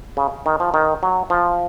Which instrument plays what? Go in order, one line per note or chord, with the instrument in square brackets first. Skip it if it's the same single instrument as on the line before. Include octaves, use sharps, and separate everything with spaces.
[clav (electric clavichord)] C#3
D#3
F3
D#3
F#3
F3